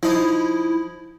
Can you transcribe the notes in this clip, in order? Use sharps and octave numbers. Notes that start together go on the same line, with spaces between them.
F3 D#4 E4